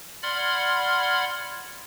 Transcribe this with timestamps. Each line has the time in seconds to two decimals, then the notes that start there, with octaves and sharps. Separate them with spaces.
0.23 D5 F#5 B5 C6 F6 G#6